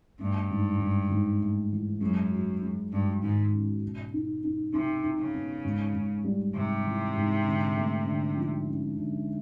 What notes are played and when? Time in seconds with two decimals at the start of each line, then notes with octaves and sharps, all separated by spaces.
0.19 G2 A3
0.50 G#2
0.80 G#2
1.10 G#2
1.41 A3
1.71 E3
2.01 F#2 G#3
2.31 F#4
2.62 G#3
2.92 G2 G#3
3.22 G#2 D#3
3.52 C#4
3.83 B2
4.13 D#4
4.44 D#4
4.73 C3 D#4
5.03 D#4
5.18 C#3
5.34 B3
5.65 G#2
5.94 G#2
6.24 G3
6.55 G#2 C3
6.85 E3
7.15 G#2
7.45 D3
7.76 A3
8.07 D3
8.36 F3
8.66 C#4
8.97 D3